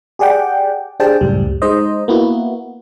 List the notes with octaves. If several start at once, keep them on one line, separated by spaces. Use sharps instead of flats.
G4 G#4 D5 F#5 G5
D4 G4 G#4 C5 G5 A5
C#2 F#2 A2 G3
G#3 D#4 C5 D#5
A#3 B3 E4 F#4